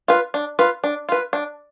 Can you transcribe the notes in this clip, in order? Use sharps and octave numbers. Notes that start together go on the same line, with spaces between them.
F4 B4
D4
F4 B4
D4
F4 B4
D4